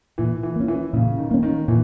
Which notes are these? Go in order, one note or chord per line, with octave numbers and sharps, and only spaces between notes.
A#2 E3
E3
A#3 C#4
E3
A#2 C#3
D#3
A#3 C#4
D#3
A#2 E3